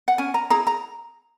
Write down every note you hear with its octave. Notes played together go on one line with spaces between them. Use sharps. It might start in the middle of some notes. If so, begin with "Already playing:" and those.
F#5
C#4 G#5
A#5
E4 G#4 A#5
A#5